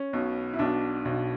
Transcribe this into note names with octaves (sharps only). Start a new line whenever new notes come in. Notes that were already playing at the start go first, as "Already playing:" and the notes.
Already playing: C#4
B1 B2
E4
B1 B2 D4
B1 B2